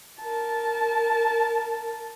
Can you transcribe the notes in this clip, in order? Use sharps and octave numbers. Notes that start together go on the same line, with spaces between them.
A#4 A5